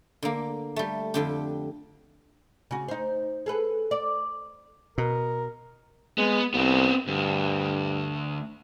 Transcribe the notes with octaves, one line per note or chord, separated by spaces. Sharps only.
D3 A#3
G3 A3
F2 D3 G4
C#3 F#4
D#4 C5
G#4 A4 B4
D5
B2 A#4
G#3 B3
C2 B3 C4
D2 G2